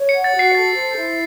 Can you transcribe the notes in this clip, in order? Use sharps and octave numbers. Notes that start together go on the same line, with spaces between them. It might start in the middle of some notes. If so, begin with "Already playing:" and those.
Already playing: C#5
C#7
F#5
A6
F#4 C7
A4 A6
C5
E4